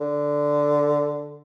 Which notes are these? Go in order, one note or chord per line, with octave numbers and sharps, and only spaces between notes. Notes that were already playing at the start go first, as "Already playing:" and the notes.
D3